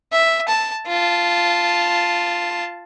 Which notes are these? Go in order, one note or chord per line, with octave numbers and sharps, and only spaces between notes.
E5
A5
F4 A5